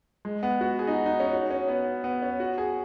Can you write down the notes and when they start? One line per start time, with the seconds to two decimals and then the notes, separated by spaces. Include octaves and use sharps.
0.25 G#3
0.43 B3
0.61 F#4
0.79 G#4
0.87 D#4
0.93 F#4
1.06 D#4
1.20 C#4
1.33 F#4
1.50 C#4
1.68 B3
2.04 B3
2.22 C#4
2.40 F#4
2.58 G#4